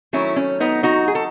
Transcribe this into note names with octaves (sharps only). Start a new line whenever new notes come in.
D#3 F#3 A3 C#4 E4
C#4
B3 D#4
D#4 F#4
G#4
A4